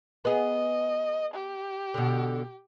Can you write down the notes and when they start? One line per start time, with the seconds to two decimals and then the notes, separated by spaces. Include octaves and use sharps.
0.25 B3 G#4 D#5
1.34 G4
1.94 B2 D3